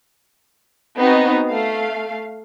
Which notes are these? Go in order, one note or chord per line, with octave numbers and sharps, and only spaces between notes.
B3 C4 D#4 F#4
A3 F5